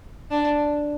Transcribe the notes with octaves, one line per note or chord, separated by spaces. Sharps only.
D4